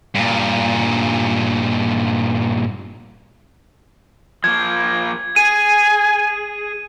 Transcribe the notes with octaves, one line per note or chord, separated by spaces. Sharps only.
G2 A#2
F3 A#3 G#6
G#4 G#5 D#7